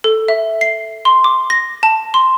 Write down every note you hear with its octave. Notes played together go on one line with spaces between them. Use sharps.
A4
E5
C7
C6
D6
A#6
A5
C6